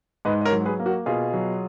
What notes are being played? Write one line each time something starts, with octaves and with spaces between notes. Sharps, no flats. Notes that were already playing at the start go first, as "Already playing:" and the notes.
G#2 B4 D#5
D#5
A#4 C#5
F#3
G#4 B4
A#3
F#4 A#4
B2 F4 G#4
F#3